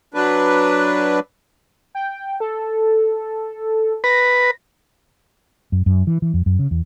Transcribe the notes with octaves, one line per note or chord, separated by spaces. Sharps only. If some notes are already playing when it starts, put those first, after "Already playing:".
F#3 D4 B4
G5
A4
B4 A#6
F#2
F#2
E3
E3
F2
F#2
C#3
E2